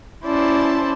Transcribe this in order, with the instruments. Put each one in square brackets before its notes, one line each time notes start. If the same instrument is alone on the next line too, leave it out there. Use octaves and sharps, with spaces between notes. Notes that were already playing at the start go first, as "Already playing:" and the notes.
[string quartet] C#4 E4 C5 D5 A5